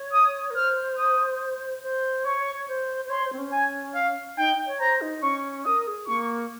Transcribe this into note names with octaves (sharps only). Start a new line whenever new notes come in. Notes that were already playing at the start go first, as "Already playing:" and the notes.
Already playing: C#5
D#6
A#4
C5 F6
D#6
C5
C#5 C#6
C5
C5
C#5 C6
C5
C4
C#4
G#5
F5
D#4 G5
C#5
C5 A#5
D#4
C#4 C#6
A#4 D#6
G#4
A#3 C#6